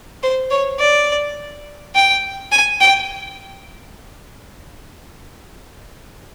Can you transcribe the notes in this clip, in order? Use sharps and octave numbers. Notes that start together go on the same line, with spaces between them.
C5
C#5
D5
G5
G#5
G5